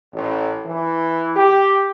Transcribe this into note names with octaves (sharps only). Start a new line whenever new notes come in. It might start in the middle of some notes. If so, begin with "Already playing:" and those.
A1
E3
G4